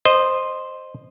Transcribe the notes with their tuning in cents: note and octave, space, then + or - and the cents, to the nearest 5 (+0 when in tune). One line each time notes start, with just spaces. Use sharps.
C5 +0 D#5 -15